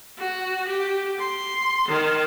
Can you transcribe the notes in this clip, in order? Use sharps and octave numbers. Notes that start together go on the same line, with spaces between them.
F#4
G4
C6
D#3